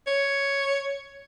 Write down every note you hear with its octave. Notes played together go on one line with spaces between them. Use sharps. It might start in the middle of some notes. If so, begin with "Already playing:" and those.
C#5